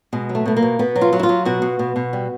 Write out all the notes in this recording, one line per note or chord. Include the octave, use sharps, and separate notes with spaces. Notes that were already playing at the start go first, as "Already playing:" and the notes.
B2 G#3
F#3
A3
B2 A3
A#3
B2
B2 B3
F#3
F4
F#3
E4
F4
F#3
B2 F#4
B2
B2
B2
G3